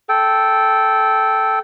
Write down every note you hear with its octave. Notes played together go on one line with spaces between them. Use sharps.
A4 G5